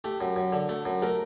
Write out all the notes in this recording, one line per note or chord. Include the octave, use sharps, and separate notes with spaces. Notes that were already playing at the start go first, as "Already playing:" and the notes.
A3 G4
F#2
F#2
D3
A3
F#2
A3 A#4